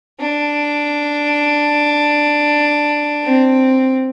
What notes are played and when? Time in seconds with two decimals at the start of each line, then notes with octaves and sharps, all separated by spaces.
0.19 D4
3.23 C4